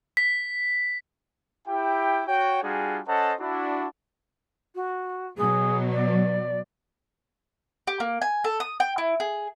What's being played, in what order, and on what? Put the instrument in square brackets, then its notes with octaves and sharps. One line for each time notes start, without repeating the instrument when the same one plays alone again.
[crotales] B6
[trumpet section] E4 G4 G5
F#4 C#5 G5
G3 D4 F4 F#4 G#4
C#4 A4 C5 D#5 F#5 A5
D4 E4 F#4
[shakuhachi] F#4
[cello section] B2 F#3 [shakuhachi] G#4
[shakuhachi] D5
[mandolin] G4
A#3
G#5
A4
D#6
G5
E4
G#4